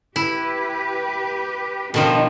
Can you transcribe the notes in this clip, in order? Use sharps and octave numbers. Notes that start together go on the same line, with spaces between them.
E4 G4 B4
B2 D#3 F3 D4 D#4